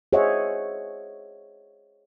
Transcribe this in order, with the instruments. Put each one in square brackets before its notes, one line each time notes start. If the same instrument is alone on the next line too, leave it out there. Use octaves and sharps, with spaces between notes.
[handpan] G#4 C5 C#5 D#5 E5 F#5